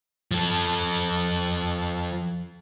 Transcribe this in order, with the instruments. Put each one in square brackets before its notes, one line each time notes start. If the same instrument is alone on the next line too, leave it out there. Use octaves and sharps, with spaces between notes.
[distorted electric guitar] F3 A4